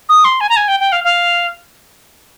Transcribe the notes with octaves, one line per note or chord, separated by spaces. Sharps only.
D#6
C6
G#5
A#5
G#5
G5
G5
F5
F5